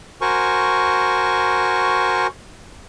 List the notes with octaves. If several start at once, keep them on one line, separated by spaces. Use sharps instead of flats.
F#4 A#4 C5 G#5 C#6